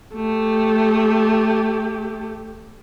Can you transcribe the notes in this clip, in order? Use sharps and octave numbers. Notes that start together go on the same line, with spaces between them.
A3 G4